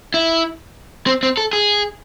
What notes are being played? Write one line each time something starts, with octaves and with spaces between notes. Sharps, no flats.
E4
C4
C4
A4
G#4